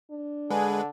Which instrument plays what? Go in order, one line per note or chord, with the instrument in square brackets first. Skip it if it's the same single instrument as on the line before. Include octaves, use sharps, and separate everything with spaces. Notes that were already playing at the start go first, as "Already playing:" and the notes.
[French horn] D4
[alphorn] D3 [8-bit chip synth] G#3 B4 [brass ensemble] G#4 G#5